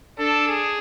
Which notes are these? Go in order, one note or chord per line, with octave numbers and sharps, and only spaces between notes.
D4 A4
G#4